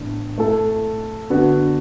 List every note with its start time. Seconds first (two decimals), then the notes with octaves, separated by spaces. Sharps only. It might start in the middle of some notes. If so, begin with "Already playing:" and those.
Already playing: A2 E3 B3 D4
0.38 A3 E4 A4
1.30 D3 B3 F#4